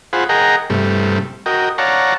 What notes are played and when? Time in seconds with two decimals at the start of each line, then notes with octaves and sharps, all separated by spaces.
0.13 F4 G#4 C5 F#5 B5
0.29 G#4 A#4 D#5 F#5 G5 A#5
0.70 G2 C3 G3 A3
1.46 F#4 A#4 D#5 G5
1.78 C#5 D5 F5 F#5 A5 A#5